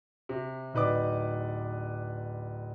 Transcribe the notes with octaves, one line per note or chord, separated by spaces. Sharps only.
C3
D1 D#4 B4 D5 D6